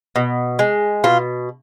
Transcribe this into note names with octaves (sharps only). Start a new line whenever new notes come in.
B2
G#3
B2 F4